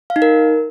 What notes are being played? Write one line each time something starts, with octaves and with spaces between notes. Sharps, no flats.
F5
D#4
A#4